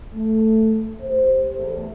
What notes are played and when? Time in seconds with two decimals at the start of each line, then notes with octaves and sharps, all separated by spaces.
0.13 A3
1.01 G4 C5
1.57 E2 A3